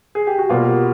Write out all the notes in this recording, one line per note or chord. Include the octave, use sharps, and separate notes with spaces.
G#4
G4
F#4
B2 G3 A#3 F4